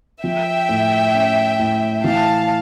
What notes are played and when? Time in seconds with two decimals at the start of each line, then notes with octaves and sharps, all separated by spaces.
0.23 F3 E5 G5
0.69 A2
1.14 C#4
1.59 A2
2.04 E3 F5 A5